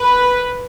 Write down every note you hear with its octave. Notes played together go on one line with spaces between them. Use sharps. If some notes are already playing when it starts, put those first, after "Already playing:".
Already playing: B4